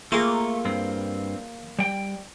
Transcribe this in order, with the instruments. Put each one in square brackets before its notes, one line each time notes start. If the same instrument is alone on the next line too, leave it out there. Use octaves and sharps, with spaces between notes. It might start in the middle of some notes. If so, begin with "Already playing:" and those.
[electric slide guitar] A3 [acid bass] A#3 [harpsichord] F4 G#4
[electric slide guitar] G2 C4
G3 G5